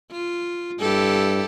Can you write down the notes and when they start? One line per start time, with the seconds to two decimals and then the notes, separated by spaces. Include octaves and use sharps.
0.11 F4
0.80 G2 E4 G4 A4